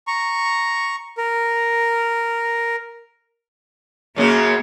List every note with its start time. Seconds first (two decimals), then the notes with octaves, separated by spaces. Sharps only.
0.07 A#5 C#6
1.18 A#4
4.16 F#2 C#3 F#3 A#3